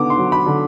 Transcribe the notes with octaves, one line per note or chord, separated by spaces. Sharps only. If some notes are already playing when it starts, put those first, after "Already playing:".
Already playing: D3 B3 D6
C6
F#3
B5
D3